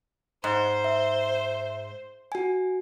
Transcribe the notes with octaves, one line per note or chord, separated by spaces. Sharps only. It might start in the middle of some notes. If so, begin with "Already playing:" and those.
G#2 C5
E5
F#4 G#5